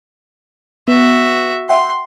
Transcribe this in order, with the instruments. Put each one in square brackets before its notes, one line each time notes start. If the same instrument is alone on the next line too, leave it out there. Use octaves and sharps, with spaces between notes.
[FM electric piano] B3 [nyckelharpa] F#4 E5
[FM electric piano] E5 F#5 G5 [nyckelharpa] C6